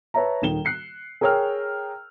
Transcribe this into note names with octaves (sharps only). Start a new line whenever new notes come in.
B4 C#5 E5 A5 A#5
D#1 D#3 E7 G7
F#6 C7 C#7
G#4 A#4 C#5 G5 E6 F6